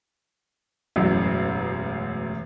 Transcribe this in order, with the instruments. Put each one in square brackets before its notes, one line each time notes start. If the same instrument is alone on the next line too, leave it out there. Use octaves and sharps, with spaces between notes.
[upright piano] E1 A1 F#2